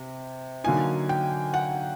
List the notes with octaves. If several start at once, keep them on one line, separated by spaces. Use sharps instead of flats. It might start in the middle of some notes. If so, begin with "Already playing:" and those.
Already playing: C3
D3 F#3 A#3 D#4 G#5
G5
F#5